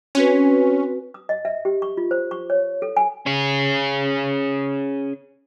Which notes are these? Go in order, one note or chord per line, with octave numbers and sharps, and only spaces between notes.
C4 C#4 F#4 B4
D#6
D#5
E5
G4
C#6
F4
C5
C#6
C#5
A4
G#5
C#4 G#4